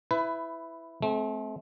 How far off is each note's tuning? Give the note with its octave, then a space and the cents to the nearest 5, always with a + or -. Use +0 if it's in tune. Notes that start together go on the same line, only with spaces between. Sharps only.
E4 +0 B4 +20
A3 -40 C4 +0